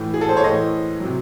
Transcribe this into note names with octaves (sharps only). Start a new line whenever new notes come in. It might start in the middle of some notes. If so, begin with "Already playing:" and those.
Already playing: A2 E3
G#4
A4
C5
C#5
A2 E3 C5 D#5
C3 F#3